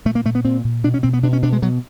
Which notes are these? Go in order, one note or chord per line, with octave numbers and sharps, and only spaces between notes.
A#2 A3
A#3
A#2 A3
B3
A#2 C4
A#2
B2 D4
C#4
B2 C4
B3
B2 D4
C#4
B2 D4
G#3
B2 F#3